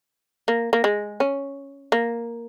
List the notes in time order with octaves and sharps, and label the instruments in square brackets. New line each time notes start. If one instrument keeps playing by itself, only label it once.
[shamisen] A#3
A#3
G#3
C#4
A#3